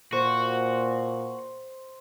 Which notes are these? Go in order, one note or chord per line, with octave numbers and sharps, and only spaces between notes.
A#2 F#4 C5